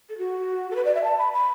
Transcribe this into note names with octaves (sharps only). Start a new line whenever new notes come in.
A4
F#4
A4
B4
D5
E5
A5
B5
B5